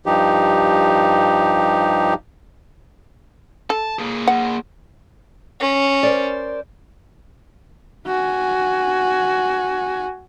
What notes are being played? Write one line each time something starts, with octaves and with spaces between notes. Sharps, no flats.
G2 F3 D#4 G4
A4 A5
A#3 G#4
F#5
C#4
A#4 C5 D5
F#4 G#5